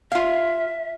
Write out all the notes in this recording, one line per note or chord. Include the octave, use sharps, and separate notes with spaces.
F4 E5 F5